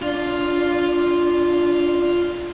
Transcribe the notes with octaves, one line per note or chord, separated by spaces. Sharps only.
D4 F4 F5